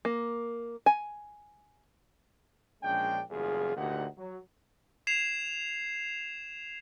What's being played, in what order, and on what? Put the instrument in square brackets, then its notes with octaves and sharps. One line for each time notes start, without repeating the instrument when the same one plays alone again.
[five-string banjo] A#3
G#5
[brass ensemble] A#1 G#3 C#4 D4 G5
F#1 E2 G3 F4 G#4
D2 A#2 A#3 D#4 G4 F#5
F#3
[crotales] G#6 C7 E7 F7